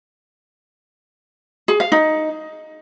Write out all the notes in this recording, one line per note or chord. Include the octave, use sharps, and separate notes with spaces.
G#4
F5
D#4